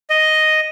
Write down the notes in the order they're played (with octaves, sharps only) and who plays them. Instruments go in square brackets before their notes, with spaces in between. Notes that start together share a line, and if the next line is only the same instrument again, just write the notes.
[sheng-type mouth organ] D#5